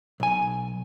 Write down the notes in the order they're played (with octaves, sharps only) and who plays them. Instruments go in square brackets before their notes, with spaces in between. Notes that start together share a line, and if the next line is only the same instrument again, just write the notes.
[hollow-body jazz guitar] B1 G#5